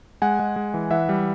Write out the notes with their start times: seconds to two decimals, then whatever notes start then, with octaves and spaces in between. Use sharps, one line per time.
0.22 G#3 F#5 G#5
0.39 G#3
0.56 G#3
0.74 E3
0.91 E3 E5 F#5
1.09 G3